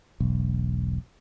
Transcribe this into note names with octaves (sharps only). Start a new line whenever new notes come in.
E1 B1